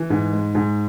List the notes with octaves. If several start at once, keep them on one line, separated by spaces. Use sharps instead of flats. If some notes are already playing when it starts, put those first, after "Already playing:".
Already playing: E3
G#2
G#3
G#2